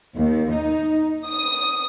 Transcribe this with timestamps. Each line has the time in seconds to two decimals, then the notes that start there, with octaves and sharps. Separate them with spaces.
0.16 D#2
0.54 D#4
1.28 D#6